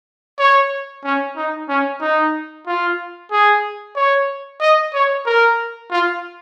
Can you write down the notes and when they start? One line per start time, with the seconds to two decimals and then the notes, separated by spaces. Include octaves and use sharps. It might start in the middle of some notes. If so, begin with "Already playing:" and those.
0.39 C#5
1.04 C#4
1.36 D#4
1.69 C#4
2.01 D#4
2.67 F4
3.31 G#4
3.96 C#5
4.61 D#5
4.94 C#5
5.26 A#4
5.91 F4